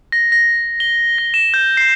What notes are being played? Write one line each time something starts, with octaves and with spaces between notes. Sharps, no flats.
A#6
A#6
G7
A#6
E7
G6
C7